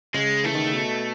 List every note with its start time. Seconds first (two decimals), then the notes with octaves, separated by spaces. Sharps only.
0.14 C#3 G#3
0.44 E3 A3
0.54 D#3
0.64 C#3
0.73 B2